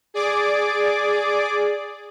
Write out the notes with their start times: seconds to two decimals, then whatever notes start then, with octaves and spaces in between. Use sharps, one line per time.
0.14 G#4 D5 D6